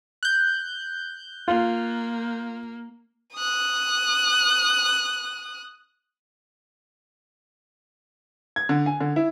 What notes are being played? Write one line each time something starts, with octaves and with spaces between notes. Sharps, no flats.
F#6 G6
A#3 F4
D#6 F#6
G#6
D3
G#5
D3
E4